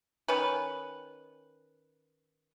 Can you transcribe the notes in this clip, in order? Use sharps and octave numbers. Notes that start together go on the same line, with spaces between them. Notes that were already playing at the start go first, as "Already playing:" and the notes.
D#3 C#4 B4